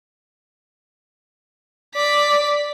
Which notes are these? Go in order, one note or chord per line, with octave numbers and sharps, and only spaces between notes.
D5 B6